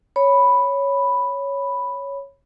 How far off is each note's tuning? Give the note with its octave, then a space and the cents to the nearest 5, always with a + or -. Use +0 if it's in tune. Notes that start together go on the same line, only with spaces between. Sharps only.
C#5 +0 B5 +0